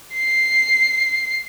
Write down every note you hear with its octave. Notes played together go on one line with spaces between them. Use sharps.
C7